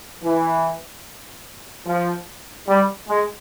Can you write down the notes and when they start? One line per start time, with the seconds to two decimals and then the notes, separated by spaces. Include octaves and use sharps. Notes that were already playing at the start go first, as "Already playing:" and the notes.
0.23 E3
1.86 F3
2.67 G3
3.08 G#3